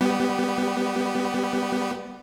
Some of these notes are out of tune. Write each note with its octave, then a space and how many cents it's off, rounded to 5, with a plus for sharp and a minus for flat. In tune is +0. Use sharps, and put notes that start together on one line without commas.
G3 +0 B3 +5 G4 -30